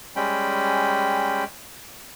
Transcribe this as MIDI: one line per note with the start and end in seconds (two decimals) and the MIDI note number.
0.16 1.44 55
0.16 1.44 56
0.16 1.44 61
0.16 1.44 79
0.16 1.44 83